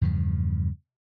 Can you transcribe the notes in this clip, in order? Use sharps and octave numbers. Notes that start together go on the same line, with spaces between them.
E2 G2 C#3 F3